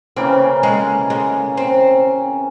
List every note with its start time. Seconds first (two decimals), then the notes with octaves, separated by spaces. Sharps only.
0.16 C#3 E3 A#3 C4 C#4
0.63 G#3
1.10 G#3
1.57 C4